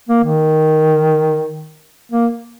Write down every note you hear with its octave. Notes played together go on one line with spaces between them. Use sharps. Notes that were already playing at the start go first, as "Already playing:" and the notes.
A#3
D#3
A#3